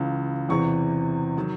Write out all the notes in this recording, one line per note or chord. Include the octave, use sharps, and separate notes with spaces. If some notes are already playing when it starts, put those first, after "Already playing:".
Already playing: C#2 C#3 E3
E2 C3 E3 C#6
D#3 F#3